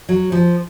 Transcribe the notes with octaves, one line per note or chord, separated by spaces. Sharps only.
F#3
F3